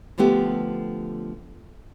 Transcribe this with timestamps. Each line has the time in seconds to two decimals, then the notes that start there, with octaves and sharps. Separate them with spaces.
0.18 D3 F3 A3 B3 G4